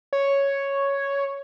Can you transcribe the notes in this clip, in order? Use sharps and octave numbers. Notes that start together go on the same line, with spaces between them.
C#5